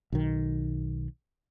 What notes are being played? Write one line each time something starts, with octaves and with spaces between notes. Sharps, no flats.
B1 D#3